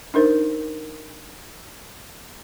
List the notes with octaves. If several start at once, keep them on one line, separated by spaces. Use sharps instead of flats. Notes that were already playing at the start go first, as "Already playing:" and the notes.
D4 D#4 A#4 C5